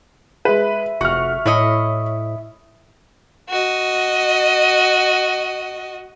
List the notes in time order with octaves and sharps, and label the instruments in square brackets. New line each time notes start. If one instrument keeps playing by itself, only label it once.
[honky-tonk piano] G#3 B4 [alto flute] E5
[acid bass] F1 [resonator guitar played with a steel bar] F#4 [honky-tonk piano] C#6 F6
[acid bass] A2 [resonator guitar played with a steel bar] E4 C#5 D#5
[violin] F#4 D#5